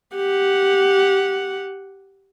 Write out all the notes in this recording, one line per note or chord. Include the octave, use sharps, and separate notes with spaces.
G4 F#5